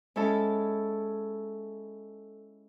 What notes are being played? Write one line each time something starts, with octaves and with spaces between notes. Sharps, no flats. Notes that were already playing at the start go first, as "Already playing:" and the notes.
G#3 C#4 E4 A4 A5